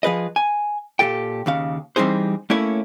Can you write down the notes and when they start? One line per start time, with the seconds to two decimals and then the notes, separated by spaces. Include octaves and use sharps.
0.03 F3 G#4 B4 D#5
0.36 G#5
0.99 A#2 F3 G4 A4 G5
1.46 D#2 C#3 F5
1.96 E3 G3 C4 D#4 G#4 C5
2.50 A3 A#3 C#4 E4 C#5